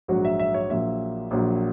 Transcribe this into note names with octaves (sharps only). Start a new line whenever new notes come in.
A#1 G#2 F#3 F#4
E5
E5
C#5
A#1 A#2 F#3 E5
A#1 A#2 F#3